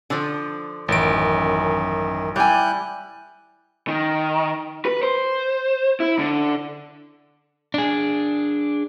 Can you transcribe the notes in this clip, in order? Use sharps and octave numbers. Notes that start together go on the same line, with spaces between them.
D3 F3
A1 F#2 D#3 D7
G3 E4 G#5 F#6 G6
D#3
B4
C5
E4
D3
D4 G#4